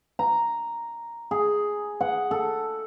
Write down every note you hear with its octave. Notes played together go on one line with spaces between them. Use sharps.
A#5
G#4
F#5
A4